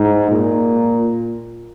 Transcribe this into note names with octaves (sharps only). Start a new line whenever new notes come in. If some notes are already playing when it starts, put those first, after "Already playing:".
Already playing: G#2
A#2